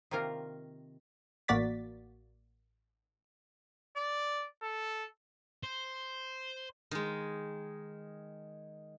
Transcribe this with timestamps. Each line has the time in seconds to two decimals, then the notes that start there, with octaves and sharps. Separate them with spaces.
0.11 C3 D#3 A#3 F4 A#4
1.48 A1 A#3 F#4 D5 A6 B6
3.97 D5
4.62 A4
5.63 C5
6.91 D#3 G#3